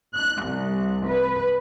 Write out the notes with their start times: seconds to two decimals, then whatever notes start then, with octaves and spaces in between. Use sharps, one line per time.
0.15 F#6
0.45 C2
1.07 B4